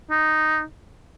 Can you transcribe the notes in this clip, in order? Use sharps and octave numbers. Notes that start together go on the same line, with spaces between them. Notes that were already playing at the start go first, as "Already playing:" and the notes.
D#4